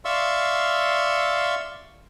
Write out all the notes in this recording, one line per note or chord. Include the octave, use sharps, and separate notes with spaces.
D5 E5 F5 C6 C#6 E6